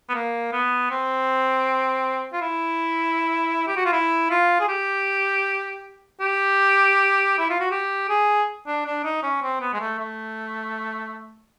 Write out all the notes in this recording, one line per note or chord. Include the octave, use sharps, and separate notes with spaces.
B3
A#3
B3
C4
F4
E4
G4
F#4
F4
E4
F4
G#4
G4
G4
E4
F4
F#4
G4
G#4
D4
D4
D#4
C#4
C4
B3
G#3
A3
A3